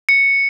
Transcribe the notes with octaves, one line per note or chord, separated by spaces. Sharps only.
C#7